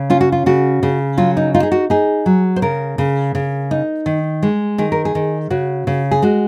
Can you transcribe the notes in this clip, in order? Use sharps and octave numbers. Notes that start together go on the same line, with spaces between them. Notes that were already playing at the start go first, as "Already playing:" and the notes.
Already playing: C#3
C#4 F4
F#4
F4
C#3 F#4
C#3
F#3 F4
D#4
D#4 F4
G#4
F#4
D#4 G#4
F#3
C5
C#3 A#4
C#3
C#3
D#4
D#3
G#3
D#3 G#4
A#4
G#4
D#3
C#3 F#4
C#3
G#4
G#3 F#4